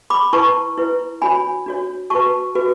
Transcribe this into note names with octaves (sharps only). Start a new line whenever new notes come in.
B5 D6
E4 B4 A5 C#6
E4 B4
D4 F#4 C#5 G#5 B5
D4 F#4 C#5
F#4 B4 A5 C#6
F#4 B4